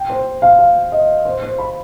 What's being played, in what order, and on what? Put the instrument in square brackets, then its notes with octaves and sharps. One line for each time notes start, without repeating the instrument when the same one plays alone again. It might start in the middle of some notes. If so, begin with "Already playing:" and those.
Already playing: [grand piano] G5
C5
F5
F5
D#5
C5
C5
B5